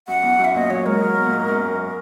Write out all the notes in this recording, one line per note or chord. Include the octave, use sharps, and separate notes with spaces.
F#2 F#5
E2
F#2
E5
A#2 D#5
F#3 C#5
G#3 A#4
F#3
B2
A#2
G#2
F#2